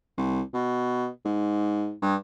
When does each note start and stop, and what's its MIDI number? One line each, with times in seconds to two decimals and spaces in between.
0.17 0.41 36
0.53 1.08 47
1.25 1.93 44
2.02 2.15 43